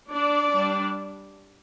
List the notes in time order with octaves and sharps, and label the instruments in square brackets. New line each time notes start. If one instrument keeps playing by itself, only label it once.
[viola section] D4 D5
G3 D4